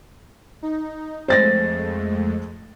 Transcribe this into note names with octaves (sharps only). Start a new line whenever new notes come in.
D#4
F2 G#3 A3 C5 A6 A#6